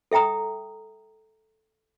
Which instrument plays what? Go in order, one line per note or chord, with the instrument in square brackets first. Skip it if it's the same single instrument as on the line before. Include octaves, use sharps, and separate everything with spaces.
[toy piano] A4 E5 G5 A#5 D#6